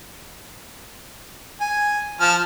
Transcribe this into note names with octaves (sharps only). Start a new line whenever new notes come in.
G#5
F3 A5 F6